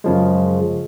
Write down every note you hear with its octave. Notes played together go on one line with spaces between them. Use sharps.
F#2 C#3 F3 G#3